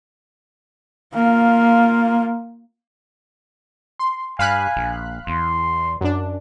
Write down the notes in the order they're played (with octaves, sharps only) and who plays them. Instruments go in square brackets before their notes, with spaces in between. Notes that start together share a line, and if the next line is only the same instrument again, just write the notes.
[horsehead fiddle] A#3 F4
[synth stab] C6
[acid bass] G2 [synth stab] F5 B5 F#6 [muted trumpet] G#5
[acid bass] A#1
[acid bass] E2 [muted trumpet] C6
[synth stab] F#2 D4